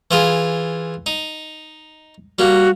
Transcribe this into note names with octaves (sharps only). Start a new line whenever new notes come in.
E3 F4 G#4
D#4
G3 A#3 F#4